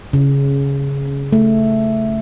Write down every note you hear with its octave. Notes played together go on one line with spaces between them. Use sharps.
C#3
A3